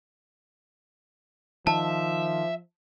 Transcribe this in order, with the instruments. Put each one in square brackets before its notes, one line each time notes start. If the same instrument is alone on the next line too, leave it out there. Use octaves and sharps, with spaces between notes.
[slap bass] D#3 [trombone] F3 [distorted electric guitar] E5 [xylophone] A5